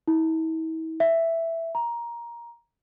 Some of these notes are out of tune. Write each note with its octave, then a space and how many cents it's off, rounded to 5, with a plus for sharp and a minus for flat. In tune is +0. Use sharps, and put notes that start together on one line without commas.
E4 -40
E5 +5
A#5 +15